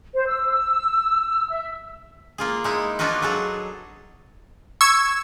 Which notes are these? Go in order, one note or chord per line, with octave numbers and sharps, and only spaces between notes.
C5
E6
E5
A#3 F4 G#4
G#3 D#4 E4
A#3 D4 D#4 F4 F#4 B4
F#3 G#4 A4
C#6 E6 G#6